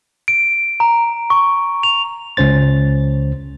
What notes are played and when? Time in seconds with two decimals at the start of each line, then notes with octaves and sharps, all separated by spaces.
0.28 D7
0.80 A#5
1.30 C#6
1.83 F7
2.37 C#2 C#4 C5 A6